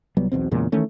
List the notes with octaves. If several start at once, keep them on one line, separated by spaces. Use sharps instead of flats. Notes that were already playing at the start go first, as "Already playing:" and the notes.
C2 F#3 G3 B3
B1 E2 B2 C4
E2 A#2 C#3 G#3
D#3 E3 A3 C#4